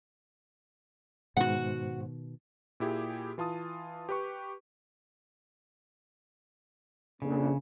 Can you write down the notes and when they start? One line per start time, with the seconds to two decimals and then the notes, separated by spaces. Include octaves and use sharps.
1.37 G#2 B2 D#3 G#3 F#4 C5 F#5
2.80 A#2 E4 G4 G#4
3.38 E3 F4 A5 D#6
4.09 G4 B4 C#6
7.22 A#1 F2 C#3